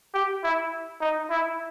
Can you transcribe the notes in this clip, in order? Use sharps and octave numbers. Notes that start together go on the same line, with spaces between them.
G4
E4
D#4
E4